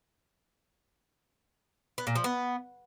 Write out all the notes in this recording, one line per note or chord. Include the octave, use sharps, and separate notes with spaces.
B3
A#2
F3
B3